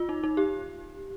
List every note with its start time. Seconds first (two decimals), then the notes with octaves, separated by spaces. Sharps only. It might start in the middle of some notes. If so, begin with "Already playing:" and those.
Already playing: F4
0.09 D#4
0.24 D#4
0.37 G4